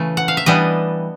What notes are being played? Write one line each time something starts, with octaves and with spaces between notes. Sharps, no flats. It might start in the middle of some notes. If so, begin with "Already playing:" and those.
Already playing: C#3 E3 A3
F#5
F5
E5
E3 G3 B3 D4 D#5